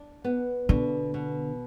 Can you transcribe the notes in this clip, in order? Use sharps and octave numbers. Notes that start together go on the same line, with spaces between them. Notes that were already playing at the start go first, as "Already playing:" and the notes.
Already playing: D4
B3
B2 D3
B2